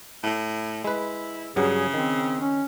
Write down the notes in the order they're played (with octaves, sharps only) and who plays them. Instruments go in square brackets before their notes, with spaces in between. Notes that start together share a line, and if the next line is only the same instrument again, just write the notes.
[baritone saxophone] A2
[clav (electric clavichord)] G#3 B4 [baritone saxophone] E4
[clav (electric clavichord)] G2 F#3 [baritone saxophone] C#3 [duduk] G#4
[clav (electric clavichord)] D#3 [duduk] C4
[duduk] C#4